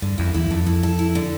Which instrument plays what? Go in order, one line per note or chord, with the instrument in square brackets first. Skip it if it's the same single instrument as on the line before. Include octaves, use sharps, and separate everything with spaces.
[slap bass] G2 [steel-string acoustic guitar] D3
[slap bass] F2 [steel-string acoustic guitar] E4
[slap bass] E2 [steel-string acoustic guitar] E4
[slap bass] F2 [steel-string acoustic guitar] A4
[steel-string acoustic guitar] E4
A4
E4
D3